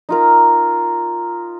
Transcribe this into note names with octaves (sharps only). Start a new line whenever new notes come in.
D#4 F4 A#4